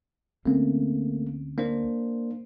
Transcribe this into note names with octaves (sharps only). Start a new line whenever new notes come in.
D2 A3 A#3 C4 C#4
A#3 D4 C5